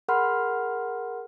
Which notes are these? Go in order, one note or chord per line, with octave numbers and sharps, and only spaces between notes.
G#4 A#4 F#5 B5 C6 F6